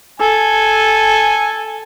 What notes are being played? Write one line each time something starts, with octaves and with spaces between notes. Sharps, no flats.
A4 G#5